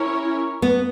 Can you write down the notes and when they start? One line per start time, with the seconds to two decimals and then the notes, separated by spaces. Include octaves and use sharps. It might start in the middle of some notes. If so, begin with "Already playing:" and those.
Already playing: C#4 E4 A#4 C#5
0.62 B3